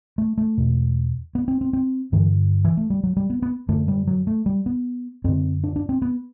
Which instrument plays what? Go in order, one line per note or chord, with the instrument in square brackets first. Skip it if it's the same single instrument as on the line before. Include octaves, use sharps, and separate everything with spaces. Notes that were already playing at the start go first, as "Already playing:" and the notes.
[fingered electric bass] A3
A3
E2 B2
B3
C4
C4
C4
G2 D3 E3
E3
A3
G3
F#3
G3
B3
B3
F#2 D3 A3
G3
F#3
A3
G3
B3
F#2 D3 C4
D4
D4
C4
B3